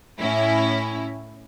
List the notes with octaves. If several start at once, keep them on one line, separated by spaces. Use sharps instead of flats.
A2 C#4 E4